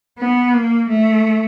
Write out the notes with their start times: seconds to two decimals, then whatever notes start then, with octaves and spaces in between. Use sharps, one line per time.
0.18 B3
0.53 A#3
0.89 A3